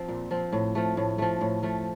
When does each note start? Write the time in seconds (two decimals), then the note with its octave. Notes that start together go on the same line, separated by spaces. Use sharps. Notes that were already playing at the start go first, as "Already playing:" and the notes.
Already playing: F3 C4
0.08 A#2
0.31 F3 C4
0.53 A2
0.75 F3 A3
0.97 A2
1.18 F3 A3
1.41 A2
1.63 F3 A3